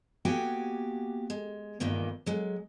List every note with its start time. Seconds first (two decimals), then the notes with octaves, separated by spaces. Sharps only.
0.25 A#3 B3 F#4 G4 G5 G#5
1.30 G#3
1.80 E2 G2 A#2 D#3 A#3
2.26 F#3 G#3